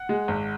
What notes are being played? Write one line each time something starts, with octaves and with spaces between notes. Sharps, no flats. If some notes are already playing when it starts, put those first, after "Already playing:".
Already playing: F#5
G#3
G#1